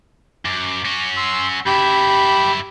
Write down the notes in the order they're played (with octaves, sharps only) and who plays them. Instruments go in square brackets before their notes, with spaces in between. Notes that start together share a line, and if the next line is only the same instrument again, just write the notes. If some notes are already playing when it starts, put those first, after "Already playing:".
[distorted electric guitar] F#2 [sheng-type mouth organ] D6
[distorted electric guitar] C#4 F#4
[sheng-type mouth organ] C6 E6
[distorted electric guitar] F#2 E4 [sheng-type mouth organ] G4 B5 G6